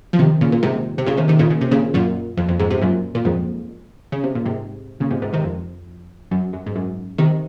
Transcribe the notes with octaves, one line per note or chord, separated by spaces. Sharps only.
F3
C3 D#3
A#2 C#3
A#2
G#2 C3
C3
A#2 C#3
C3 D#3
C3 D#3
A#2 C#3
C#3
C3
A#2 C#3
F#2 A#2
F2
F2
F2 G#2
G#2 C3
F#2 A#2
A#2
F2 G#2
C#3
C3
A#2
G#2 C3
A#2 C#3
G#2 C3
G#2 C3
C3 D#3
F2
F#2
F#2
G#2
F#2
C3 D#3